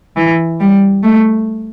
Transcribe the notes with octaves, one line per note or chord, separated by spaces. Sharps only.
E3
G3
A3